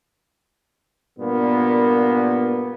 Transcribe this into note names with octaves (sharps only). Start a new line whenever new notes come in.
G2 A#2 A#3 B3